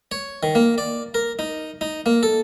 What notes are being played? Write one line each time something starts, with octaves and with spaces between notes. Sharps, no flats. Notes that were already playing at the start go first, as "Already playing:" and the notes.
C#5
D#3
A#3
D5
A#4
D#4
D#4
A#3
A4